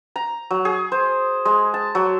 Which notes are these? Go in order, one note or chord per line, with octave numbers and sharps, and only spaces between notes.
A#5
F#3
G#4
C5
G#3
A5
F#3